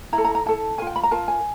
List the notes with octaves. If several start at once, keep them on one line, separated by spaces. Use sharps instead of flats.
E4 A#5
A4
A#5
A#5
E4 A4 A5
A#4 G#5
F4 G5
B5
A#5
F4 A#4 A5
G#5